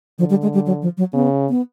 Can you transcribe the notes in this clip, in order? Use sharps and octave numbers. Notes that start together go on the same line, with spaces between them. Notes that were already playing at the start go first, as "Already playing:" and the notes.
D3 F3
G3
G#3
G3
F#3
F3
F#3
C#3 B3
B3